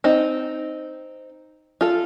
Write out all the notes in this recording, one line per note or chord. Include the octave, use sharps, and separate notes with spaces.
C4 D#4
F4 A4